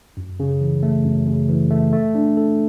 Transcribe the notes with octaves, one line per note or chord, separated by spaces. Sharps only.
F#2
C#3
E3
A3
F#2
C#3
E3
A3
A3
D4
A4